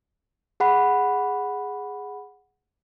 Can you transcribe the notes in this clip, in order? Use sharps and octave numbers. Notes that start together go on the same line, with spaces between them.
G#4 F#5 B5